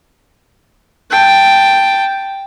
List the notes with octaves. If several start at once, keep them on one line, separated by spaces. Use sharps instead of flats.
G5 A5